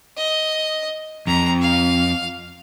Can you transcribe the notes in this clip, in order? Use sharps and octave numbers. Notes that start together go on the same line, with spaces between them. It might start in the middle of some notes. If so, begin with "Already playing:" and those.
D#5
F2 A#5
F5